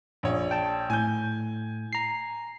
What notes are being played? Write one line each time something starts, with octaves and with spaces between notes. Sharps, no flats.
A#1 C#5
G5 A5
A2 G#5 G6
A#5 C7